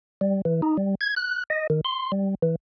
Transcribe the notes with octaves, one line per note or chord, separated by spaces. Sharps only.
G3
E3
D#4
G3
G#6
F#6
D#5
D#3
C6
G3
E3